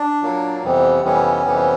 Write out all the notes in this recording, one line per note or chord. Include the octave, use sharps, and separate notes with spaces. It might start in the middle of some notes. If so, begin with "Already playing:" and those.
Already playing: D4
A#2 F#3 A#3
F2 C3 E3 G3 B3
F2 C3 E3 G3 B3 C#4
F2 C3 E3 G3 B3